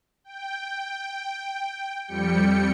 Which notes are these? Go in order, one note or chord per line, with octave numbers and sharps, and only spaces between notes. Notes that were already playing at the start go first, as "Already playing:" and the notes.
G5
F2 G3 G5 C#7